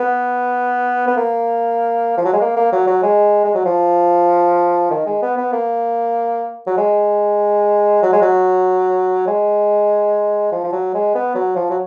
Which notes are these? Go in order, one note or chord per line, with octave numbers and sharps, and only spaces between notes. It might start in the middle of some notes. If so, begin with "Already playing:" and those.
Already playing: B3
B3
A#3
F3
F#3
G#3
A#3
A#3
F#3
F#3
G#3
G#3
F#3
F3
D#3
G#3
B3
B3
A#3
F#3
G#3
F#3
G#3
F#3
G#3
F3
F3
F#3
G#3
B3
F#3
F3
F#3